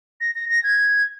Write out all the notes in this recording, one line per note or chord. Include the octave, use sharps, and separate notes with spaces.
A#6
A#6
A#6
G#6